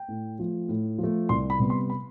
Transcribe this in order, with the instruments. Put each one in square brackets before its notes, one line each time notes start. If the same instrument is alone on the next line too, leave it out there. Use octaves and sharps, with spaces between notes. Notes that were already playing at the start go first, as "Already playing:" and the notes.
Already playing: [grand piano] G5
A2
F3 A3
A2
F3
A3
C2 C6
B5
C3 G3 B3
C6
B5